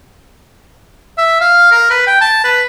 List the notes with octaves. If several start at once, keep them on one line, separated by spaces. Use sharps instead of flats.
E5
F5
A#4
B4
G5
A5
B4